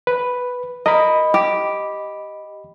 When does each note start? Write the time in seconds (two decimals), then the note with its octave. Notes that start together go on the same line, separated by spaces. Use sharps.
0.07 B4
0.86 A#4 D#5 B5
1.34 G4